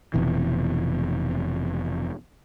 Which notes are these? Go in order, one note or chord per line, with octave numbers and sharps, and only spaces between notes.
F1 B2 E3